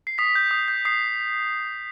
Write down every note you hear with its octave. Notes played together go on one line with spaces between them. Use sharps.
C7
D#6 B6
G6
D#6
G6
D#6 C7